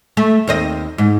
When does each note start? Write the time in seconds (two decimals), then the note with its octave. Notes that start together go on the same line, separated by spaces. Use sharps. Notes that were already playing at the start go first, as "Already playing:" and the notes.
0.17 A3
0.47 D#2 C4 D#5
0.98 G#2